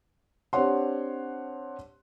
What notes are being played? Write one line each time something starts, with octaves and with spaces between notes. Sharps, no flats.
C4 D4 G4 C#5 F#5 C6